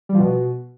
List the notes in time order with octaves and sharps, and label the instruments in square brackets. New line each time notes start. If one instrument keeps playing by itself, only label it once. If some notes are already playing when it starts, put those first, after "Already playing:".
[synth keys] G3
F3
B2